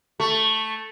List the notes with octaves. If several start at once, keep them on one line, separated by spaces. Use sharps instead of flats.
A3